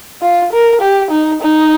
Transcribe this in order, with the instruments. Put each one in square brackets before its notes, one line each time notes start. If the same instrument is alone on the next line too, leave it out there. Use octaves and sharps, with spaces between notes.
[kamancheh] F4
A#4
G4
D#4
D#4